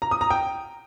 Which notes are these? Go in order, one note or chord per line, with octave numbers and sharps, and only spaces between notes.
A#5
D#6
A#5
G5